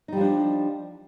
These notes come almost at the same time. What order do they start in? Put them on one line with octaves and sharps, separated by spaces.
D#4 G3 F3 D4